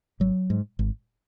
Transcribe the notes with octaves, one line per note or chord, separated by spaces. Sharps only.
G#1 F#3
G#2
G#1